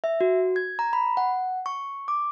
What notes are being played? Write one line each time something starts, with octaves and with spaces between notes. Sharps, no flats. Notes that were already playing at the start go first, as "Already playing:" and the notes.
E5
F#4
G#6
A#5
B5
F#5
C#6
D6